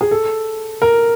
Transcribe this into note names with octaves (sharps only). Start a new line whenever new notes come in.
G#4
A4
A#4